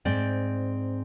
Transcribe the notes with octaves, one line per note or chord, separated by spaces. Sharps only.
G#2 C4 C5 D5